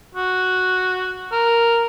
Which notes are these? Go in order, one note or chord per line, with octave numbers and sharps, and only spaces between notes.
F#4
A#4